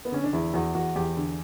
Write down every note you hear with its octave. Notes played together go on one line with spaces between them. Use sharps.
B3
D3 C#4
D4
E2 E4
E2 F#4
E2 F#4
E2 G4
D3